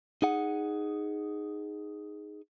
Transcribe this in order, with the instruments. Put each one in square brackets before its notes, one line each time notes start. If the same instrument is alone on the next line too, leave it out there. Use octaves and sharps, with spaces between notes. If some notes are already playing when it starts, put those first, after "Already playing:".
[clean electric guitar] D#4 G#4 F#5